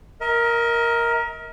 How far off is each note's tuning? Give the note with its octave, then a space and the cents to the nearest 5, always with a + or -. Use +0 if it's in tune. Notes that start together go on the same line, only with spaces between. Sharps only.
A#4 +5 D#5 +45